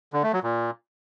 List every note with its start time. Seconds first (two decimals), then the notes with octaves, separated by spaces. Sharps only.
0.13 D3
0.23 A3
0.33 F#3
0.43 A#2